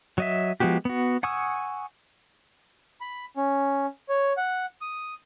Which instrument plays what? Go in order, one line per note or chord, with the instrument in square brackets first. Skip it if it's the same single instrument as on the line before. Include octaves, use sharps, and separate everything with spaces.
[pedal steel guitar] F#3 D#5 E5
F3 G#3 B3 F#4 G4
B3 F#4
F#5 G#5 C#6 D#6 E6
[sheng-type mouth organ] B5
C#4
C#5
F#5
D#6